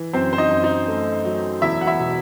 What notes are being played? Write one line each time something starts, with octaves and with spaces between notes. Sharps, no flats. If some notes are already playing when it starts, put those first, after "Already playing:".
Already playing: E3
F#2 C4 C5
C5
D#4 D#5
F#2
D#4 D#5
A3
F#3
E1 E4 E5
F#5
E4 E5
B2